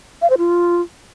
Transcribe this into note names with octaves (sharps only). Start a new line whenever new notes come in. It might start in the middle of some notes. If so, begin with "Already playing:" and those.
F5
C5
F4